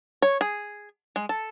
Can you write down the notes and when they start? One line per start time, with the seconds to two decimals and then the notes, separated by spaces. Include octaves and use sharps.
0.22 C#5
0.41 G#4
1.16 G#3
1.29 A4